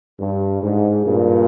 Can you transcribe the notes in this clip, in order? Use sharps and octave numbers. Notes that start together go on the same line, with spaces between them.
G2
G#2
G2 A#2